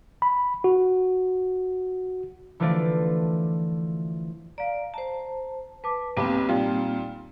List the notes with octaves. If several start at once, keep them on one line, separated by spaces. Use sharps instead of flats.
B5
F#4
D3 E3 F3 A3 F4 D5
D5 F5 A#5
C5 A5 A#5
B4 A5 D6
B1 A#3 C4 G4 B4 D6
A#2 G3 D#4 F4 G5